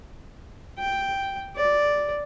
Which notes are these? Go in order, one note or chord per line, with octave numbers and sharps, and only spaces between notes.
G5
D5